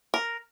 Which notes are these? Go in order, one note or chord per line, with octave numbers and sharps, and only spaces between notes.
A#4